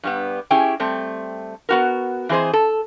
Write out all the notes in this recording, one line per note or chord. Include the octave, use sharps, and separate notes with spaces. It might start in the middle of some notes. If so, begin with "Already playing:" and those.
G2 G3 B3
C#4 E4 G4 G#4 G5
G3 A3 C4
B3 F#4 A#4
E3 C4 G#4 C5 D#5
A4